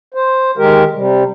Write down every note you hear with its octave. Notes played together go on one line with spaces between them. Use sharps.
C5
D#3 G#3 G4 A#4
C3 G3